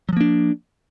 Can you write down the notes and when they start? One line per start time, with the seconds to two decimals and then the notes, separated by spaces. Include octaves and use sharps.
0.09 F#3
0.13 F3
0.17 A#3
0.21 D4